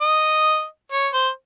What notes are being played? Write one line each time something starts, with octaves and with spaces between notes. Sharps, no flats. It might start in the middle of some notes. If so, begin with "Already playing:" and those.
D#5
C#5
C5